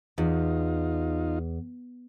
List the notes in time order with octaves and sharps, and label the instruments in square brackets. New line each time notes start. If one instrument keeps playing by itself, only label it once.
[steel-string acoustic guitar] E2 [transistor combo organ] D#4 F4